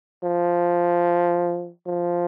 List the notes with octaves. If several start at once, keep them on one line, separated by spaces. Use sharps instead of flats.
F3
F3